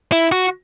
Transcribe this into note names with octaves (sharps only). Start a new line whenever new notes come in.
E4
F#4